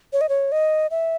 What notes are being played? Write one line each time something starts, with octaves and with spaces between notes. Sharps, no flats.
C#5
D#5
C#5
D#5
E5